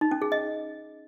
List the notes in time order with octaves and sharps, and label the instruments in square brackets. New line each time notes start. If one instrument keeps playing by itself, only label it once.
[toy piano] D#4
C#4
G#4
D#5